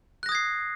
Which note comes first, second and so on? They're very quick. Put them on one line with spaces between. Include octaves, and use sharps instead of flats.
F#6 A#6 D#6 G#6 C7